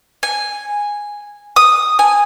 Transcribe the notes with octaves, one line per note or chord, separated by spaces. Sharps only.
G#5
D#6
G#5